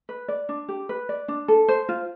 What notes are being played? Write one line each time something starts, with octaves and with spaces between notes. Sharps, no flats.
B4
D5
D4
G4
B4
D5
D4
A4
C5
F4